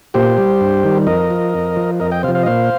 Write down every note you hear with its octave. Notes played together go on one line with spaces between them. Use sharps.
A#2 G4 C5
G3
G2
D#3 G3
F2 A#4 D#5
F3
F2
F3
F2 A#4 D#5
D#5 G5
C3 C5 F5
F3
C5 F5
D#5
A#2 C5 F5